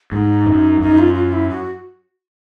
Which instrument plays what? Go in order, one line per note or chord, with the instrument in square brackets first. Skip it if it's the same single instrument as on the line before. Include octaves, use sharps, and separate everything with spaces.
[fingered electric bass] G#2 [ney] D#4
[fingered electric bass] F#2
[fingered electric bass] F#2 [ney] D#4
[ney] F4
F4
E4
F#4